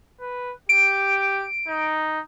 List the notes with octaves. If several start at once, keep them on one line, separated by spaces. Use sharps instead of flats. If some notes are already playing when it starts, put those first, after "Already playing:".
B4
G4 D7
D#4